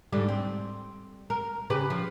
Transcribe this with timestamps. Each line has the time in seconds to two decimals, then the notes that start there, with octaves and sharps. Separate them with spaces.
0.13 G#2 D3 G3
0.29 C4
1.30 A#4
1.70 C#3 G4 B4
1.90 F3